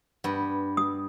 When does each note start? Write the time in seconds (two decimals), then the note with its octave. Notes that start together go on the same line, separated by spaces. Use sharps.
0.24 G2 B3
0.77 D#6